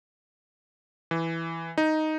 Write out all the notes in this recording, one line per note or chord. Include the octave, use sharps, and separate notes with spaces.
E3
D#4